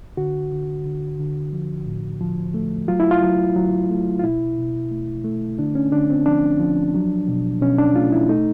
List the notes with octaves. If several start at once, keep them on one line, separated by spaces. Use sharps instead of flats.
D3 F#4
D3
D3
D3
F3
A2
F3
A3
F#3 F4
E4
F4
F#3
F#3
A3
F4
B2 E4
B2
A3
A3
D3 D4
C#4
D3 D4
C4
F3 D4
F3
F#3
B2
B2 C#4
D4
A3 F4
E4
A3 D#4